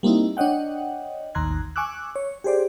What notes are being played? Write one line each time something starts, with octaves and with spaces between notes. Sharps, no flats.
G3 A#3 C4 D#4 E4
D4 C#5 D#5 F#5 G5
A1 D#2 A#5 C6 F#6 G#6
G#5 C#6 D6 E6 F#6
C#5
G4 G#4 C5 D5